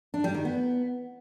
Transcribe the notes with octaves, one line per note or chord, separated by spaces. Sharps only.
D4
G3
D#3
B3